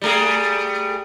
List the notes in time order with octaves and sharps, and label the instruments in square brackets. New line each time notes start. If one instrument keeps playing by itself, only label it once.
[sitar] G3 A3 G#4